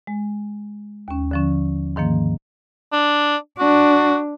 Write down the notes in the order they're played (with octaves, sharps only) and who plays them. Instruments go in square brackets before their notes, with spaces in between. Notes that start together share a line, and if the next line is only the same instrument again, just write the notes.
[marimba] G#3
D#2 C#4
D3 F3 C#4
G#2 D#3 F3 A#3
[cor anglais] D4
[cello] D4 [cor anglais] F#4